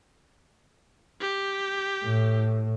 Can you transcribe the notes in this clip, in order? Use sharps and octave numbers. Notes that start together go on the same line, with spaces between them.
G4
A2